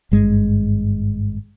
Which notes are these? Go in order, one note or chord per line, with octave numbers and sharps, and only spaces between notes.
G#1 G2 G#3